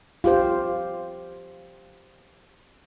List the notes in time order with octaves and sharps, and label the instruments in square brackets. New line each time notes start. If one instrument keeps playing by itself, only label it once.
[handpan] F4 G4 C5